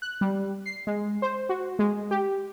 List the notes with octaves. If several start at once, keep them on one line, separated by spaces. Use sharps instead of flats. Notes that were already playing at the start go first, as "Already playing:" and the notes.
F#6
G3
C7
G#3
C5
F#4
G#3
G4